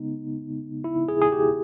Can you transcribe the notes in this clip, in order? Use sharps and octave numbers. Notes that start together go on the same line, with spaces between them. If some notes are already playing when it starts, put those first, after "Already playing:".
Already playing: C#3 G#3 B3 D#4
E4
G#4
G#4
G4